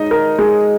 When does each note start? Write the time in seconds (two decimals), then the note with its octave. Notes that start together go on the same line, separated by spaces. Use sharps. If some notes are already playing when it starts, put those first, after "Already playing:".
Already playing: G#3 D#4 D#5
0.11 A#4
0.39 G#3